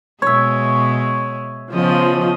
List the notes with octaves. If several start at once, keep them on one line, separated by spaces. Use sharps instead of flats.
B2 G#3 C#5 E5
C#3 F3 B3 D#5